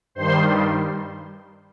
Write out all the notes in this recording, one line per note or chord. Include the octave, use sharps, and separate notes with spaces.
G2 D#3 G3 C5 C6